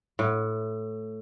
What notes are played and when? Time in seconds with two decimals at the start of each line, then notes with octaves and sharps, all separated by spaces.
0.19 A2